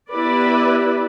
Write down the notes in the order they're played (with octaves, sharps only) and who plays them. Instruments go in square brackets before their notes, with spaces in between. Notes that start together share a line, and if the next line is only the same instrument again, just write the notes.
[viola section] B3 E4 G4 B4 D5